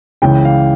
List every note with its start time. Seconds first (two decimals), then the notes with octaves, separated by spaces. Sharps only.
0.22 C#2 C#3 E3 G5
0.45 F5